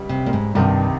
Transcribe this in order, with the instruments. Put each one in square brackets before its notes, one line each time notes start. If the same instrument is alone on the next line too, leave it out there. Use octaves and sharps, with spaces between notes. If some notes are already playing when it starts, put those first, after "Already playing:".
Already playing: [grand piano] C#2 G3
[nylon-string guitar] C3
A#2
G#2
[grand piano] C2 C3 D#3 [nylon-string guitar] G2